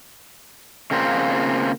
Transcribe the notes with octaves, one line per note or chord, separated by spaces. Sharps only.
C#3 A#3 C4 F4